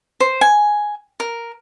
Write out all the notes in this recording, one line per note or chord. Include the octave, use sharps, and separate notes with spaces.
C5
G#5
A#4